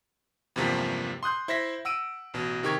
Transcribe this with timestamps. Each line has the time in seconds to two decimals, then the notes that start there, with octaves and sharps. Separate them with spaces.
0.56 E2 G2 C3 F3 A#3 B6
1.23 C6 D#6 F#6 G6
1.48 E4 C5 E5 A#6 B6
1.85 F#5 E6 D7 D#7
2.34 A1 B2
2.63 C3 D#3 G4 A#4 C#6 G#6